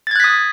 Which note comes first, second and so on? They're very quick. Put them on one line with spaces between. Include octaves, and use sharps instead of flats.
A6 G#6 F#6 B6 D#6